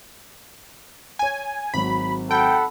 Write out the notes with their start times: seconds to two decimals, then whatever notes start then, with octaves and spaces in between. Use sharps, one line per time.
1.19 C#5 G#5 D#7
1.74 G#1 F#3 B5
2.31 A4 F#5 G5 B5